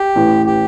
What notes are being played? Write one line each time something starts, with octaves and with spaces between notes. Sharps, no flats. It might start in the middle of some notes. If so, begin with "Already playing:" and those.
Already playing: G4
A1 A2 E3
G4